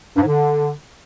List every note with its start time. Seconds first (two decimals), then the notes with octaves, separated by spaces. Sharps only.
0.15 G2
0.20 G#2
0.26 D3